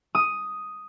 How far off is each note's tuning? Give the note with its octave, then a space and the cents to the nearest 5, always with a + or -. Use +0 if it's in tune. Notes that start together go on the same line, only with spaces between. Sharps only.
D#6 +5